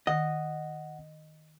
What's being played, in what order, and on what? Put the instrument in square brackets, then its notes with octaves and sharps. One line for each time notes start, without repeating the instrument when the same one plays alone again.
[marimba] D#3 [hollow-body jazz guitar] D#5 [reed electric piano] F#5